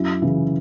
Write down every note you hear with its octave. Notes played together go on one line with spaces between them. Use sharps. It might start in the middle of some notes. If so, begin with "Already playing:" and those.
Already playing: F#2 E4
C#3 E3